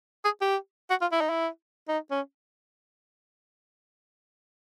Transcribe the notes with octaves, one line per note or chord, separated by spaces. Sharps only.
G#4
G4
F#4
F4
E4
D#4
E4
D#4
C#4